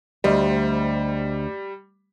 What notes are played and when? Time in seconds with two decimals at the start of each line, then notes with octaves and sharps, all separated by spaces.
0.24 D2 G3 C5 D#5